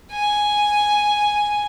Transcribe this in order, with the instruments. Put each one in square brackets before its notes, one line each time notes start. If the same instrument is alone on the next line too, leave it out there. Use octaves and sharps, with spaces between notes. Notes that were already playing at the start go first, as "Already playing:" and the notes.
[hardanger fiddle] G#5